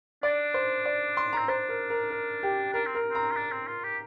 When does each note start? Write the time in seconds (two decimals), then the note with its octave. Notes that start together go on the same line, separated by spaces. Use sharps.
0.23 D4 D5
0.54 C5
0.86 D5
1.17 C6
1.33 A#5
1.37 C4
1.48 D4 C5
1.69 A#4
1.90 A#4
2.11 A#4
2.43 G4
2.73 D4 A#4
2.86 C4
2.95 A#4
3.10 C4
3.15 A#5
3.31 F4
3.36 D4
3.52 C4
3.67 F4
3.84 G4